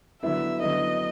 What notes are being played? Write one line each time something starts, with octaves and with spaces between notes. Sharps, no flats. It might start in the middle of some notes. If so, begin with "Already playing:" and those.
D3 F#3 B3 E4 E5
D3 F#3 B3 E4 D#5